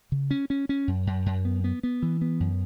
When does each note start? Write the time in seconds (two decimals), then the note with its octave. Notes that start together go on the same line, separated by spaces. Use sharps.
0.12 C#3
0.31 C#4
0.50 C#4
0.69 C#4
0.88 F#2
1.07 F#2
1.26 F#2
1.45 B3
1.64 B3
1.83 B3
2.02 E3
2.21 B3
2.40 F#2